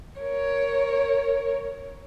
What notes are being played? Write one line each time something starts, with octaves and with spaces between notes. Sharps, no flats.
A#4 C#5